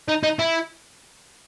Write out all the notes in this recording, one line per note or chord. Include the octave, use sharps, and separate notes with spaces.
D#4
D#4
E4